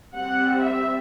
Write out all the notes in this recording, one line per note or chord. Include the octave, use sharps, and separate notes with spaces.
G3 C4 F#5
E5